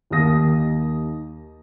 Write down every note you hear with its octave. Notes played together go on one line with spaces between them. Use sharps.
D#2 D#3 G4 F5 D#6 A#6